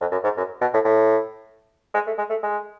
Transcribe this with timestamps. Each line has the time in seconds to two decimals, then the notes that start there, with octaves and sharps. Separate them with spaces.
0.01 F2
0.12 F#2
0.24 G#2
0.37 F#2
0.61 B2
0.73 A2
0.84 A2
1.94 G#3
2.07 A3
2.18 G#3
2.30 A3
2.43 G#3